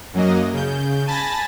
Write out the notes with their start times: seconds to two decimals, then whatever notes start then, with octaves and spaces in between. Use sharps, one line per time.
0.14 F#2 F#3 A#3 D#5
0.53 C#3 G6
1.07 G#5 A5 B5 A6 A#6